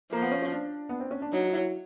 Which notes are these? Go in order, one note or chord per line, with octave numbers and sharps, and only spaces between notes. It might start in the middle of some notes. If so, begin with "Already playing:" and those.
F3 A#3
B3
C#4
C#4
D4
B3
C4
C#4
D4
F#3 D#4
D#4
E4